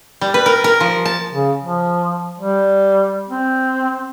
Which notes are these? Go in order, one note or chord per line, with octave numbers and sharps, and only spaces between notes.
G3
B4
A#4
A#4
F3
A5
C#3
F3
G3
C4